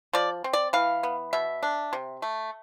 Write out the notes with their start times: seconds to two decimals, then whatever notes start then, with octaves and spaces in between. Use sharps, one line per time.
0.13 F3 D5
0.44 C4
0.53 D5
0.73 E3 F5
1.03 B3
1.33 B2 E5
1.63 D4
1.93 C3
2.22 A3